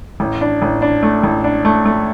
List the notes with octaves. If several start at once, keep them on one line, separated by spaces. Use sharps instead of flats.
A1
D4
A1
D4
A3
A1
D4
A3
A3